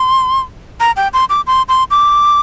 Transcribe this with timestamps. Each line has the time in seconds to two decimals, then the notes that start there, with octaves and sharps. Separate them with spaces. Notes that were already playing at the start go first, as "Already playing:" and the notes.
Already playing: C6
0.80 A#5
0.96 G5
1.13 C6
1.29 D6
1.47 C6
1.69 C6
1.91 D6